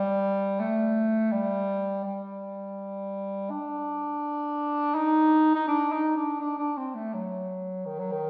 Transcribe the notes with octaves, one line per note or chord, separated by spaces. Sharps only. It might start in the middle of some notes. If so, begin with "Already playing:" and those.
Already playing: G3
A3
G3
G3
D4
D#4
D#4
D4
D#4
D4
D4
D4
C4
A3
F#3
D#3
F#3
D#3